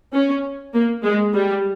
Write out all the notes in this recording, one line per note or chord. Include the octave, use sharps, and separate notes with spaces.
C#4
A#3
G#3
G3